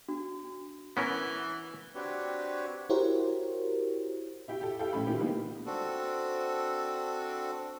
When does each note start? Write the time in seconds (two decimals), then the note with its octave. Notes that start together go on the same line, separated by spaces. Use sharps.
0.09 D4 F#4
0.97 E3 B3 C#4 A#4
1.95 C4 D4 F#4 G4 B4 C#5
2.90 E4 F#4 G4 A#4 C5 C#5
4.48 E4 G4 E5 G5
4.61 G4 A4
4.79 E4 G4 A4 F5 G5
4.93 A#1 A3 C#4 B5
5.07 D#3 E3 A#3 F4 G4
5.20 D3 D#3 G3 G#3 A#3 B3
5.66 C4 D4 F#4 A4